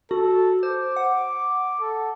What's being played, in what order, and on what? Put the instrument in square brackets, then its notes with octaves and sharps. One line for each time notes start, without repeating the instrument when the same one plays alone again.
[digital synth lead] F#4 [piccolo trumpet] A4
[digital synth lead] C5 [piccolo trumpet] D6
[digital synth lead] F#5
[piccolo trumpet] A4